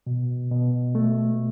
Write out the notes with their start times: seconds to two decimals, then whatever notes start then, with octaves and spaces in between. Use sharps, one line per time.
0.07 B2
0.51 B2
0.95 A3